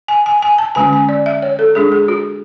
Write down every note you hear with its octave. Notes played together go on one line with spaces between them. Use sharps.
G#5
G#5
G#5
A5
D3 G#3 C#4 G#5
G#5
D5
E5
C#5
A4
G#3 D4 G#4
G#4
F#4